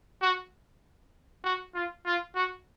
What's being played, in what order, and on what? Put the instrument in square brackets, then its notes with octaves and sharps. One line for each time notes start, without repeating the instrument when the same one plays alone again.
[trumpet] F#4
F#4
F4
F4
F#4